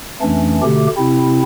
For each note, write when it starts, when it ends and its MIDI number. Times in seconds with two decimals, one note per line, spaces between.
0.22 0.61 41
0.22 0.61 52
0.22 0.61 57
0.22 0.61 61
0.22 0.61 62
0.63 0.87 47
0.63 0.87 50
0.63 0.87 57
0.63 0.87 67
0.97 1.43 48
0.97 1.43 60
0.97 1.43 64